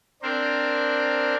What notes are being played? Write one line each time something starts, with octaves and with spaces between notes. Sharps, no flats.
C4 D4 A#4 C5